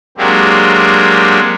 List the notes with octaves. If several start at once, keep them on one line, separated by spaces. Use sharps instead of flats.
F#3 G#3 A#3 C4 D4 G4